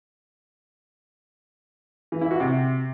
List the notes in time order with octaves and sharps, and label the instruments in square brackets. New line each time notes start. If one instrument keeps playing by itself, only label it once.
[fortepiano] E3
E4
F#4
C3